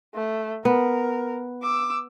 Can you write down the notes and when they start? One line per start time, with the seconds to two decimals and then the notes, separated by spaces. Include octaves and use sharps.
0.15 A3
0.65 B3 A#4
1.62 D6 E6